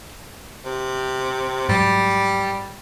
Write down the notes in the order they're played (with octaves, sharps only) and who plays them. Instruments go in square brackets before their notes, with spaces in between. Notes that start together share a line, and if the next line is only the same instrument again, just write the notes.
[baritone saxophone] C3
[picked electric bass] G#2 F#3 [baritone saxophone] G3